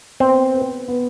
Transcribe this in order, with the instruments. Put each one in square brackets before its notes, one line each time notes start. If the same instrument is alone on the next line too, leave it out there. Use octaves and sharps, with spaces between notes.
[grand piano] B3 [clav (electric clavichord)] C4
[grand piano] B4
B3